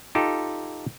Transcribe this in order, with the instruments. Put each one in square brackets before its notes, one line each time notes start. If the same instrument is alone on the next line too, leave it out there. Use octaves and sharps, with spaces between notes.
[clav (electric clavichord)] D#4 F4 G4 A4